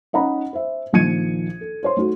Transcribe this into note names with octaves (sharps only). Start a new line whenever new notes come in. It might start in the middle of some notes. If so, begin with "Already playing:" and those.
C#4 D#4 D#5 F#5 A#5 B5
C5 E5
A#1 D#3 F3 G#6 C#7 D#7
A4
C5 C#5 C6
A3 D#4 F#4